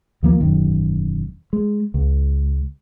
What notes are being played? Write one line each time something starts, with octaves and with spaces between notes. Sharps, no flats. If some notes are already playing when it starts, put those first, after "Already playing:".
D#2 F3 A#3
E1 F#2 D#3
G#3
C#2